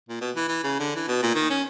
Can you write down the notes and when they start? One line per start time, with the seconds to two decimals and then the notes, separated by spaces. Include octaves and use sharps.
0.09 A#2
0.21 B2
0.36 E3
0.48 E3
0.63 C#3
0.79 D3
0.96 E3
1.07 B2
1.23 A#2
1.35 D#3
1.50 C#4